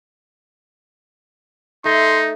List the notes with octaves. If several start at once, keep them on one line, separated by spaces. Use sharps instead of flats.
A3 D#4 C6